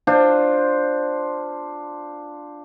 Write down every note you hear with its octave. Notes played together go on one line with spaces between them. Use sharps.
D4 F4 C5